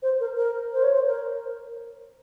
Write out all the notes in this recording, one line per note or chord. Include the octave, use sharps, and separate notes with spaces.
C5
A#4
A#4
C5
C#5
C5
A#4